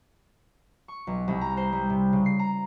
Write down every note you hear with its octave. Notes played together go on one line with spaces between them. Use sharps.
C#6
B1
C2
A#5
C5
G3
C3
C#3
C7
A#5